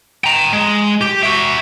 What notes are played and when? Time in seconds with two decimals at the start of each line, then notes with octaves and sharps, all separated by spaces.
0.24 G5 A#5
0.53 G#3
1.01 G4
1.23 F#4 E5